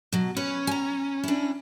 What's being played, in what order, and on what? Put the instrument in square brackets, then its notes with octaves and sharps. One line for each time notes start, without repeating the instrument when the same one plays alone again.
[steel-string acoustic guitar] B2 F#3
[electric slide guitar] C#4 [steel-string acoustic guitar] B4
[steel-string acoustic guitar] G#5 A#5
D4 E4